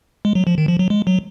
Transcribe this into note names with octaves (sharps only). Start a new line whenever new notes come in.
G#3
F#3
F3
D#3
F3
F#3
G#3
F#3